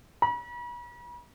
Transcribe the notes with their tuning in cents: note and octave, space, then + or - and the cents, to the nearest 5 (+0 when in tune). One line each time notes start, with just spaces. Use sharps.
B5 -45